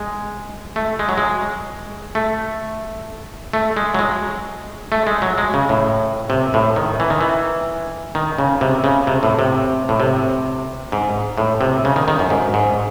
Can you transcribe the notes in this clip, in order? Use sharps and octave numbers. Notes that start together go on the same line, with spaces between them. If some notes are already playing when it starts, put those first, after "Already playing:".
Already playing: G#3
A3
G#3
F#3
G#3
A3
A3
G#3
F#3
G#3
A3
G#3
F#3
G#3
C#3
A2
C3
A2
D#3
E3
D#3
E3
D#3
C#3
C3
C#3
C3
A2
C3
A2
C3
G#2
A2
C3
C#3
D#3
D#3
F#2
G#2
G#2